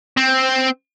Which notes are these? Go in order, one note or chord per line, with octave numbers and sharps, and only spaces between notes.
C4